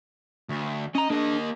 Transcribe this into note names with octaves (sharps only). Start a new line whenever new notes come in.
D2
C#4 D#5 A#5
A#3 D4 G#4 D#5